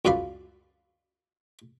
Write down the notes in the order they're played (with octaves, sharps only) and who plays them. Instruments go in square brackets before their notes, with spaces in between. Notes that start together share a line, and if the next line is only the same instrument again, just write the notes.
[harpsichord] C#2 F#2 D5 F5 B5